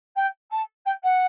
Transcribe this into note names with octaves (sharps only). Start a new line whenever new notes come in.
G5
A5
G5
F#5